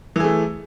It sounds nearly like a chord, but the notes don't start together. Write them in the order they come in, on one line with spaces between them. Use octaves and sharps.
E3 G#4 A3